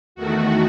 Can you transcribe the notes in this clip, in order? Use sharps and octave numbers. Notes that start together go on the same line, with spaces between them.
E2 D#3 A3 F#4